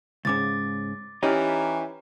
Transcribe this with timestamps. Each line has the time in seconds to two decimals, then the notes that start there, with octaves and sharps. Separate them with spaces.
0.25 C#2 G#2 C#3 D6 A6
1.23 E3 C#4 D#4 E4 G4 B4 C#5 A#5